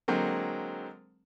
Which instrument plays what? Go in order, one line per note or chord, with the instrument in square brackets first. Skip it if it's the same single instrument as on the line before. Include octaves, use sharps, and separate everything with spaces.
[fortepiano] D3 F#3 G#3 A#3 C4